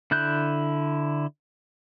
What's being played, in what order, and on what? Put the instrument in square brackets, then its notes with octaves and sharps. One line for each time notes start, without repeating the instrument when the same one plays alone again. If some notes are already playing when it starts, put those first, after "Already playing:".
[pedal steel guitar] D3 E4 F#6 G6